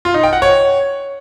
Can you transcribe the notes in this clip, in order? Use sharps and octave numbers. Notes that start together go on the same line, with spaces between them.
F4
D#4
G5
F#5
C#5